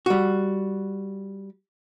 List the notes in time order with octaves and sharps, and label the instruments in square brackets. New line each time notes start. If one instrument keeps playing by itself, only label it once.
[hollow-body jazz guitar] G3 F#4